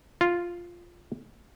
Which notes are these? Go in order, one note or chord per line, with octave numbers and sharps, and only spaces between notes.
F4